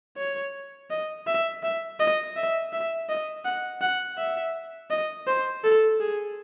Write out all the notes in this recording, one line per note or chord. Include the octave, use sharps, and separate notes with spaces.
C#5
D#5
E5
E5
D#5
E5
E5
D#5
F#5
F#5
E5
D#5
C5
A4
G#4